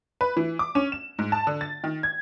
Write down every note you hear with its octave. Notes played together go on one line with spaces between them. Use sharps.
B4
E3
D6
C#4
E7
G#2
A5
D3
A6
D#3
G#6